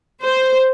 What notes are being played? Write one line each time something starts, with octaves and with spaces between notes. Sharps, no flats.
C5